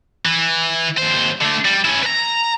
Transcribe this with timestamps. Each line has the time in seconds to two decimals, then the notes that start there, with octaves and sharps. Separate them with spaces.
0.25 E3
0.97 D#2 C5
1.41 D3 A3
1.65 G3
1.85 C#4 E4
2.03 B4 A#5